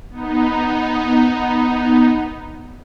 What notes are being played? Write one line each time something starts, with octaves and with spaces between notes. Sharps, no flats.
B3 D#4